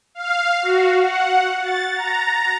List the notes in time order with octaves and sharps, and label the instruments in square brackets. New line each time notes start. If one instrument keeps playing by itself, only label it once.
[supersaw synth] F5
F#4
F#5
A6
A#5